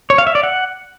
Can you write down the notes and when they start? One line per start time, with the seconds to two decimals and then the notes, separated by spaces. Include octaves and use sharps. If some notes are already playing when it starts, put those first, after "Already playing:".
0.10 C#5
0.18 F5
0.27 E5
0.35 D5
0.43 F#5